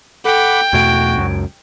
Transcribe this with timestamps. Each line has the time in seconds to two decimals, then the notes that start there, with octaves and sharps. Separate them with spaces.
0.25 A4 F#5 G5 B5 D6
0.73 E2 B2 A3 F#4 G#6 D7
1.17 C#2 F#2